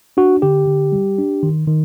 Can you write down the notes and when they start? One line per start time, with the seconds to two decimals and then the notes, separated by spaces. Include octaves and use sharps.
0.17 D4 F#4
0.42 D3 G4
0.67 D3
0.92 G3
1.18 D4
1.43 D#3
1.68 D#3